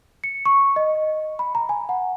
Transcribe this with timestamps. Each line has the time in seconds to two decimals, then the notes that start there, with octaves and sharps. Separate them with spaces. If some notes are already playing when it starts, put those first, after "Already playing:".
0.24 C#7
0.46 C#6
0.76 D#5
1.39 B5
1.55 A#5
1.69 G#5
1.89 F#5